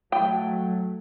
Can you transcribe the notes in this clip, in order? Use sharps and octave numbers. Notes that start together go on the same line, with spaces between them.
F#3 A3 G5